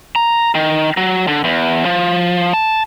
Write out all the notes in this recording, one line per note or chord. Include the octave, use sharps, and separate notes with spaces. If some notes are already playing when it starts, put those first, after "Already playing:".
A#5
D#3
F#3
D3
E2
F3
A5